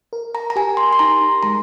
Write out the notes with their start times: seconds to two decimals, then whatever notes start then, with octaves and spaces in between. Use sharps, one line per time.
0.13 A#4
0.35 A#5
0.50 A#5
0.56 G4 G#5
0.77 C6
0.93 C6
0.99 D#4 A#5
1.43 G#3 A#5